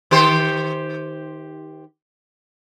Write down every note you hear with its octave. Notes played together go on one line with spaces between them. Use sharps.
D#3 G4 C5